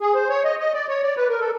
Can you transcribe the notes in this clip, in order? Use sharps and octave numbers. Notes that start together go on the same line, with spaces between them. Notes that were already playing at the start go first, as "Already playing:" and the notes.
G#4
C5
C#5
D#5
D#5
D5
C#5
D5
B4
A#4
A4